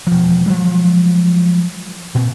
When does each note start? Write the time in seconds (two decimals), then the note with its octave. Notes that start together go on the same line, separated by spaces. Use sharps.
0.07 E1 F3
0.46 F3 F#3 G#3
2.15 A#2 C4